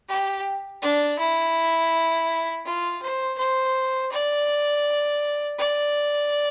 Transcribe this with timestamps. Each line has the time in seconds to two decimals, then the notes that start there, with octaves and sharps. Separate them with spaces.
0.08 G4
0.82 D4
1.19 E4
2.65 F4
3.02 C5
3.38 C5
4.12 D5
5.58 D5